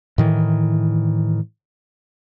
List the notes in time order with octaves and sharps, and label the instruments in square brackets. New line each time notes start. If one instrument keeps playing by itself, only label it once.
[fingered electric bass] A2 D#3 E3